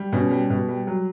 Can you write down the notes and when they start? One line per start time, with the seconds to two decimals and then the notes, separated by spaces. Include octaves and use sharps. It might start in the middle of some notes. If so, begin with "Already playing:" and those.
Already playing: G3
0.12 B2 C#4
0.31 G3
0.50 B2
0.68 G3
0.87 F#3